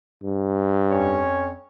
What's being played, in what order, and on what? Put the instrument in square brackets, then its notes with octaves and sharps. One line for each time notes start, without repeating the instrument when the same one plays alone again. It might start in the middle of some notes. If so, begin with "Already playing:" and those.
[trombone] G2
[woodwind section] F2 C#4 C#5